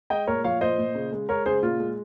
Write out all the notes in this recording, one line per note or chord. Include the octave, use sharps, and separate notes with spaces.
G#3 D#5 G5
A#2 A#4 C#5
F3 C#5 F5
A#2 C5 D#5
A#2
C#3
G#3
G#3 A#4 C#5
C#3 G#4 C5
A#2 F4
G#3